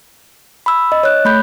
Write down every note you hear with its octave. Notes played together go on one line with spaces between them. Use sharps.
B5 E6
D#5
C#5 F#6
A3 B5 G6